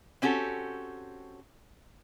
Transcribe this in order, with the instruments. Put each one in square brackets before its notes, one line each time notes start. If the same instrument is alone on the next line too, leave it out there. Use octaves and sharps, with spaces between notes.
[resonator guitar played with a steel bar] C4 C#4 F#4 G4 A4